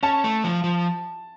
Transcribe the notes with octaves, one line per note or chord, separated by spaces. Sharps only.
C#4 A5
A3
F3
F3